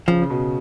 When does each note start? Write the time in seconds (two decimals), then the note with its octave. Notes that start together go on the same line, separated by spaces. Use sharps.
0.08 C#3 F3
0.22 C#3
0.30 B2